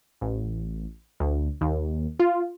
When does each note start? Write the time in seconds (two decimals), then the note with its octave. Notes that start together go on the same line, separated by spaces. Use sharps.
0.21 A1
1.20 D2
1.61 D#2
2.20 F4